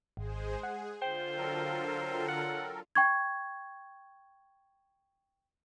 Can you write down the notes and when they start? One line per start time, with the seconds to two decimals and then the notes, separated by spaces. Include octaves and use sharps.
0.17 G#1 G#3 G#4 C5
0.63 G#4 F#5
1.02 D3 F4 C5 G5
1.37 F#3 A4 A#4
2.28 F#5
2.95 G5 C#6 G#6